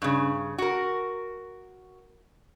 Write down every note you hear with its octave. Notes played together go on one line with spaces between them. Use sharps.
G2 C#3
F#4 A#4